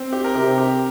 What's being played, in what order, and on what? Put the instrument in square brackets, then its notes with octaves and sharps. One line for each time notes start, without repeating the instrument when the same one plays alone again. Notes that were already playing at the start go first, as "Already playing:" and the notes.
Already playing: [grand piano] C4
G4
A#4
[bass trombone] C3 [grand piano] G4
[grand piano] G4